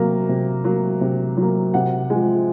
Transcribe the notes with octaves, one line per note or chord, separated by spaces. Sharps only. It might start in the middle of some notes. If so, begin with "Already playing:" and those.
Already playing: C3 F#3 A#3
C3
F#3 A#3
C3
F#3 A#3
C3 F#5
F3 G#3